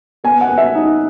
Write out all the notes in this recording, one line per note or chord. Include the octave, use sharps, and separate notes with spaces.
B3 G#5
F#5
B3
E5
D#4